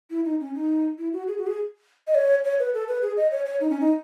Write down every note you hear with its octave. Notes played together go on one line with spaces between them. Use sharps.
E4
D#4
C#4
D#4
E4
F#4
G#4
F#4
G#4
D#5
C#5
C#5
B4
A4
B4
G#4
D#5
C#5
C#5
D#4
C#4
D#4